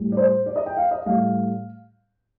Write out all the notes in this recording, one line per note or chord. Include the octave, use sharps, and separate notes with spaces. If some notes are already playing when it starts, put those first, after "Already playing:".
Already playing: A2 G3
D5
C5
D5
D#5
G5
F5
D#5
A2 G3 F5